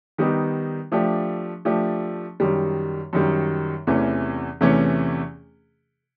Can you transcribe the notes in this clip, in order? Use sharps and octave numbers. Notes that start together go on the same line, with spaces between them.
D#3 G3 B3 D#4 G4
F3 A3 D4 G4
F3 A3 D4 G4
F#2 D#3 G3
F#2 D#3 G3
E2 C3 E3 A3 C#4
E2 C3 E3 A3 C#4